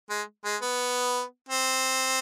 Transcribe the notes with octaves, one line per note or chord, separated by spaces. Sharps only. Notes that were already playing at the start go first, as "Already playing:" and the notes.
G#3
G#3
B3
C4